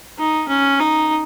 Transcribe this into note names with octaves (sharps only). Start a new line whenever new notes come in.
D#4
C#4
D#4